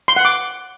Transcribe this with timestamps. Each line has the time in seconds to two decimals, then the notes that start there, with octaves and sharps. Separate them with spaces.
0.08 C6
0.16 F#5
0.25 D6